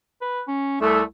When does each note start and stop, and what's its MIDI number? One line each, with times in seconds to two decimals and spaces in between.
0.21 0.42 71
0.48 0.80 61
0.81 1.02 36
0.81 1.01 57